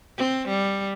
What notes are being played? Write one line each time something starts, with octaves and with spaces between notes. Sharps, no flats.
C4
G3